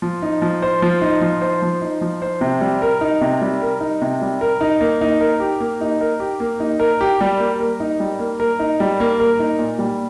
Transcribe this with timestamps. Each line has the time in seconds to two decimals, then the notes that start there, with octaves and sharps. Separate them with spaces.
0.02 F3
0.22 D#4
0.42 F3
0.62 C5
0.82 F3
1.02 D#4
1.21 F3
1.42 C5
1.62 F3
1.82 D#4
2.01 F3
2.22 C5
2.41 C3
2.61 G3
2.82 A#4
3.01 D#4
3.21 C3
3.41 G3
3.62 A#4
3.81 D#4
4.01 C3
4.21 G3
4.41 A#4
4.61 D#4
4.81 A#3
5.01 D#4
5.21 A#4
5.40 G4
5.60 A#3
5.81 D#4
6.01 A#4
6.20 G4
6.40 A#3
6.60 D#4
6.80 A#4
7.01 G4
7.21 G3
7.40 A#3
7.60 A#4
7.80 D#4
8.00 G3
8.19 A#3
8.40 A#4
8.59 D#4
8.80 G3
9.00 A#3
9.20 A#4
9.40 D#4
9.59 A#2
9.79 G3